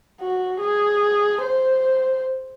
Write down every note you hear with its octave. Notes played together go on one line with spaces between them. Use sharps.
F#4
G#4
C5